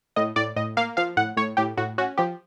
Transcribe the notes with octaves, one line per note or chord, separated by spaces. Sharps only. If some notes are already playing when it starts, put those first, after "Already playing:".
A2 D#5
A2 D5
A2 D#5
A#3 F5
F3 F5
A2 F#5
A2 C#5
A2 G4
A2 F#4
C#4 F#4
F3 G4